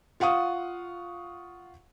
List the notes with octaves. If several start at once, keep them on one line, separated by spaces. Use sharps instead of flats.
F4 F5 F#5 C#6 D#6